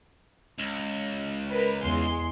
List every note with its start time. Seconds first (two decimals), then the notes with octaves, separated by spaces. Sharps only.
0.58 C#2
1.50 A#4 B4
1.81 E2 G#3 C6